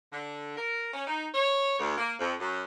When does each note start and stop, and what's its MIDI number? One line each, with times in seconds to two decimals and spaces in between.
0.12 0.53 50
0.57 0.93 70
0.94 1.03 61
1.07 1.27 63
1.35 1.79 73
1.79 1.96 38
1.98 2.13 58
2.20 2.34 41
2.39 2.62 42